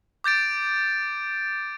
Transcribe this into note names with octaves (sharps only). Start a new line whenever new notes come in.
D6 G6 A6 D7